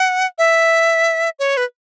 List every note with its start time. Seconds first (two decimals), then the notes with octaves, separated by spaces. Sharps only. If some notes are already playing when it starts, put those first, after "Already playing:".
Already playing: F#5
0.38 E5
1.39 C#5
1.57 B4